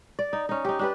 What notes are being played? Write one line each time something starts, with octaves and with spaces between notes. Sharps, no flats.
D5
D#4
C#4 D#4
D#4 G4
D4 G4 B4